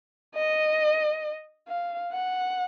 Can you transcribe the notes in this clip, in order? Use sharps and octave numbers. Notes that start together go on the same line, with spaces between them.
D#5
F5
F#5